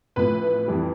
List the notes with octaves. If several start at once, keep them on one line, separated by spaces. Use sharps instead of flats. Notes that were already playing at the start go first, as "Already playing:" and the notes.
A1 A2 F3 B4
F2 E3 G3